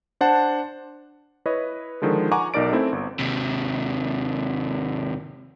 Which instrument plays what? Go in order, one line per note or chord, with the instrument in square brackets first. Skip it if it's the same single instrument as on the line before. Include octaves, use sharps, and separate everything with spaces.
[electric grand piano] D4 C5 F#5 A5
E4 B4 C#5 D#5
D3 D#3 F3 G#3
F#5 G#5 A#5 C#6 D6
B1 D#4 A#4 D5 D7
A3 C4 C#4 E4
G1
[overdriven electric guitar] D#2 C3